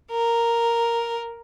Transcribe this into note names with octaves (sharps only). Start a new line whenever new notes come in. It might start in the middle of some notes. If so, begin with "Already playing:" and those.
A#4